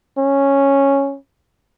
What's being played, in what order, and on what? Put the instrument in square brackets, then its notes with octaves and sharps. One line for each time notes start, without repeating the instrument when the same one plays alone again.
[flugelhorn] C#4